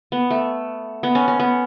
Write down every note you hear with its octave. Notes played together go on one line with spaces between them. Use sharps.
B3
A3
B3
C#4
C#4
B3